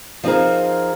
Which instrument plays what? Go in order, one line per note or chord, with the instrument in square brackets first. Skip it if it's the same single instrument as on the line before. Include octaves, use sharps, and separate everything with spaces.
[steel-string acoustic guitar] F3 C4 D#4 G#4 A#4